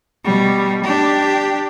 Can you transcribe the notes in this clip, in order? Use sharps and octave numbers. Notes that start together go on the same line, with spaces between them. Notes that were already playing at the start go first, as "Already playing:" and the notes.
B2 G3
D4 G4